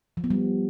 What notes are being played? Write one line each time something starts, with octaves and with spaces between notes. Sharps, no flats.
F3
B3
G3